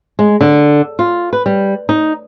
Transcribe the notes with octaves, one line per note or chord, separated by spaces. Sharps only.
G#3
D3
F4
B4
G3
D#4